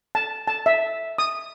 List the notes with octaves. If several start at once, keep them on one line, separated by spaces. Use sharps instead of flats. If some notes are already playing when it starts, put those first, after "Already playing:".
A5
A5
E5
D#6